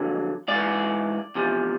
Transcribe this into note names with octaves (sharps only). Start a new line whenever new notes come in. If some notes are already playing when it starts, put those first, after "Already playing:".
Already playing: F2 D3 F#3
G#2 E3 D5
E2 C3 F3